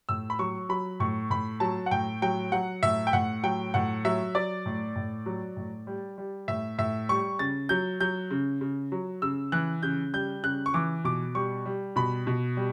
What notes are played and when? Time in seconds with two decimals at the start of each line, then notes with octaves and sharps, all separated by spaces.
0.09 A2 E6
0.30 B5
0.39 F#3 C#6
0.69 F#3 B5
1.00 A2 C#6
1.30 A2 B5
1.60 F#3 A5
1.86 F#5
1.91 A2 G5
2.22 F#3 G5
2.52 F#3 F#5
2.83 A2 E5
3.07 G5
3.13 A2 F#5
3.43 F#3 G5
3.74 A2 F#5
4.05 F#3 E5
4.35 F#3 D5
4.66 A2
4.96 A2
5.26 F#3
5.56 A2
5.87 G3
6.18 G3
6.48 A2 E5
6.78 A2 E5
7.09 G3 C#6
7.39 C#3 A6
7.69 F#3 G6
8.00 F#3 G6
8.31 C#3
8.61 C#3
8.92 F#3
9.22 C#3 E6
9.52 E3 F#6
9.83 C#3 G6
10.13 G3 G6
10.43 C#3 F#6
10.66 C#6
10.74 E3 D6
11.04 B2 D6
11.35 G3 C#6
11.65 G3
11.96 B2 B5
12.27 B2
12.57 G3